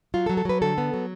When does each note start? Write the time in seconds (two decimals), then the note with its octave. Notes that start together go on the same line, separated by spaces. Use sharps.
0.14 F#3 F4
0.26 A4
0.29 F#3
0.37 A4
0.45 F#3 B4
0.62 D3 A4
0.78 B3
0.94 F#3